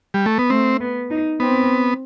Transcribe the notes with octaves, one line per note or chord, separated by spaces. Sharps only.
G3
A3
B3
A3 C4
B3
D#4
B3 C4